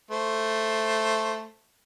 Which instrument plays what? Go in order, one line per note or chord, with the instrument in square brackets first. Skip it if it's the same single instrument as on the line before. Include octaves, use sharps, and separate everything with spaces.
[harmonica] A3 C5